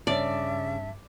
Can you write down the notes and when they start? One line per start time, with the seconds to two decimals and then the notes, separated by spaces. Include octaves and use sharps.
0.07 G2 C#3 D5 E5 A5